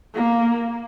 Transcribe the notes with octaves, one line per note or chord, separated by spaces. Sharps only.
A#3